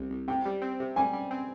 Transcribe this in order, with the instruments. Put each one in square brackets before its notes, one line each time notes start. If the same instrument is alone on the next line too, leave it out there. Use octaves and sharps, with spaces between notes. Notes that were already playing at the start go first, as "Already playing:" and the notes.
Already playing: [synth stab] C2 C3
C2
[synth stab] C3 [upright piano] G5
[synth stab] G3
C4
C3
[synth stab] G3 [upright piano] G#5
[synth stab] G3
C4